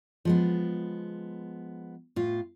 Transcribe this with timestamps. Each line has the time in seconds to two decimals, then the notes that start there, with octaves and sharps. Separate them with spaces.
0.25 F3 G#3 B3
2.16 A2 F4